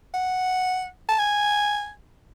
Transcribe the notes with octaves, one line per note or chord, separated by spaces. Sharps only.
F#5
A5
G#5